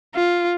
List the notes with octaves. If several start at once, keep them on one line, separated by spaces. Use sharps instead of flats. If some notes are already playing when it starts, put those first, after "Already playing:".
F4